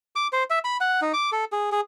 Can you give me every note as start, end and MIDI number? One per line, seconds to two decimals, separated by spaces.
0.16 0.27 86
0.33 0.44 72
0.50 0.59 76
0.64 0.77 83
0.81 1.00 78
1.02 1.12 63
1.14 1.30 86
1.32 1.45 69
1.52 1.70 68
1.72 1.81 68